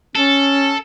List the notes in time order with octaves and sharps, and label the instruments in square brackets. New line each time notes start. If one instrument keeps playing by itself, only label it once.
[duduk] C#4 [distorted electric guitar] A4